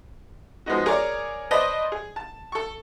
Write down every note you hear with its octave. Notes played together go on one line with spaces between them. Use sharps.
F3 G#3 B3 D#4 F#4
G#4 A#4 C#5 D5
B4 C5 D5 D#5 A5 B5
G#4
A5
A4 C#6